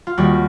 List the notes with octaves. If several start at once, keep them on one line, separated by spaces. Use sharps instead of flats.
F4
D#2 D#3 G3 F#4